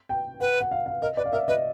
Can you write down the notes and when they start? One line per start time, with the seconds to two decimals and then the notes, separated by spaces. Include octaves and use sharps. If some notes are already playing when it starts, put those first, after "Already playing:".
0.09 G5
0.40 B4 F#5
0.61 F#5
0.71 F5
0.86 F5
1.02 A#4 D#5
1.17 B4 D5
1.26 F5
1.32 A#4 E5
1.48 B4 D#5